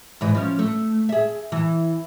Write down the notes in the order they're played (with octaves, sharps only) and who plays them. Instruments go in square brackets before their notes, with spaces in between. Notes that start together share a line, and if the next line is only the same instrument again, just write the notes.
[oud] G#2 E3 D#5
F3 C#4
A3
G#4 E5
E3